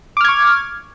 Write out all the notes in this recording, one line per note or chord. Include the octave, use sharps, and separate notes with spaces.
C#6 D6 F6 G#6